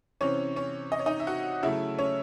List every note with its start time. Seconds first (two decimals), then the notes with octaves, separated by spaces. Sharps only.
0.21 C3 E3 C4 C#4 C#5
0.56 C#4 C#5
0.92 D#5
0.99 C#5
1.06 D#4 D#5
1.20 E5
1.27 F#4 F#5
1.63 C#3 F#3 A3 E4 E5
1.99 C#4 C#5